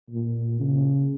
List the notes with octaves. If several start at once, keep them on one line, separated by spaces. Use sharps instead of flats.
A#2
C#3